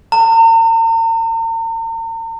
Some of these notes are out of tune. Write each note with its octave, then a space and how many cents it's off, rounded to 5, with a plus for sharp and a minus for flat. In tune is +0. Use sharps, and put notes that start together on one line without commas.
A#5 -45